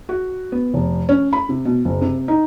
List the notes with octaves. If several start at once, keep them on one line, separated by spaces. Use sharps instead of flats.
F#4
B3
F1
C#4
B5
C3
B2
F#1
C3
D#4